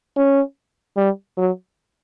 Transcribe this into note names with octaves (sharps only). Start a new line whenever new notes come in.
C#4
G3
F#3